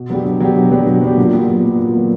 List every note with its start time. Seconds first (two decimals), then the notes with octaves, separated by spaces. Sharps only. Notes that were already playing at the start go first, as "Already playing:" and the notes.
Already playing: B2
0.10 F#3 B3 D4 G4
0.25 B2
0.40 F#3 B3 D4 G4
0.56 B2
0.72 F#3 B3 D4 G4
0.87 B2
1.02 F#3 B3 D4 G4
1.18 A#2
1.33 F#3 B3
1.49 A#2
1.64 F#3 B3
1.79 A#2
1.95 F#3 B3